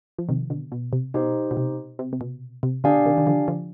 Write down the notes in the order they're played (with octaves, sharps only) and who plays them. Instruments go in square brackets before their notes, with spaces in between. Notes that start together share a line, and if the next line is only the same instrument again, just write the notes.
[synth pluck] F3
C3 D#3
B2 D3
B2
C3
[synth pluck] B2 [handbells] D#4 G4 C5 D#5
[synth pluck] B2
C3
C3
C3
B2
C3
[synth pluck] B2 D3 [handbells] D4 G4 D5 F5 G#5
[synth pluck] C3 D#3
D#3
D3 F3
D3 F3